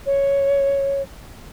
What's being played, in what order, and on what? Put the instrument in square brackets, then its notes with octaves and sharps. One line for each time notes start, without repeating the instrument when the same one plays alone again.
[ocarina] C#5